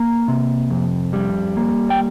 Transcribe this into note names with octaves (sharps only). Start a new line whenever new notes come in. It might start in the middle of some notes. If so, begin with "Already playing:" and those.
Already playing: A#3 A#5
C3
F2
G3
A#3
G5